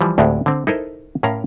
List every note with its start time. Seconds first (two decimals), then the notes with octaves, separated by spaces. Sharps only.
0.01 E3 F3 G3
0.18 D2 A2 G#3 C4 G4
0.46 D3 C4
0.67 D#4 E4 A4 A#4 C5 D#5
1.23 A2 C#4 A#4 F5 A#5